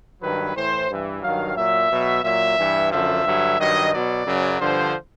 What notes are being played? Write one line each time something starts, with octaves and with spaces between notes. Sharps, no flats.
G2 D#3 F#3 B4
A2 E3 C5
G2 E3
G2 D#3 F#3 F5
A#2 F#3 E5
B2 F#3
A#2 F#3 E5
G2 E3
F#2 D3 F3 E5
G2 D3 F#3
G2 D#3 F#3 D#5
B2 F#3 D5
F#2 C#3 F#3
G2 D3 F3 C5